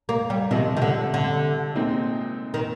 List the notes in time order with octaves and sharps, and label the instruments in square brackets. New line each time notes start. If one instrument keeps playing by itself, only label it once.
[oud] A#3
G3
[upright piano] C3 F3 G#3 [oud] D#3
[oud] D#3
D3
D3
[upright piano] A#2 G#3 C4 D#4
[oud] D#3